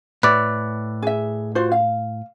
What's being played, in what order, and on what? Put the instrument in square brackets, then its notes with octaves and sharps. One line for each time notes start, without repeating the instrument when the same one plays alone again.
[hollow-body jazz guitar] A2 [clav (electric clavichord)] B4 D5
[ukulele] G#4 E5
F4 F#4 C5
F5